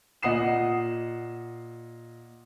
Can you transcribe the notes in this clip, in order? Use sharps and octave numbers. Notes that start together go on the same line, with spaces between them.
A#2 D#5 F#5 D#6 C7 E7